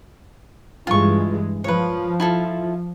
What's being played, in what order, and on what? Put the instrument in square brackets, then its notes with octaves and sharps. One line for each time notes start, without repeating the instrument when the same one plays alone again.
[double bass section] G2 E3 G#3 [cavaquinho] F4 C#6
[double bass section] F3 [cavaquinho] B4 C#5
[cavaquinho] E4 F4 A4